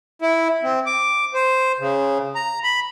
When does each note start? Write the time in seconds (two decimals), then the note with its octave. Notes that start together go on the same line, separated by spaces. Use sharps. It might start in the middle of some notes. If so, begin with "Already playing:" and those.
0.22 E4
0.63 C4
0.86 D6
1.34 C5
1.80 C#3
2.35 A#5
2.64 B5